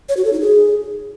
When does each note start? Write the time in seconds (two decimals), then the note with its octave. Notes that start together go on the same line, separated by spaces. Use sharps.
0.09 C#5
0.17 F#4
0.25 A4
0.33 D#4
0.41 G#4